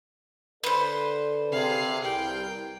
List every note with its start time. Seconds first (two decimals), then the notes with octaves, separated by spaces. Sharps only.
0.64 D3 A4 B4 C5 D5
1.52 C3 G#4 F5
2.04 C2 G3 A#4 G5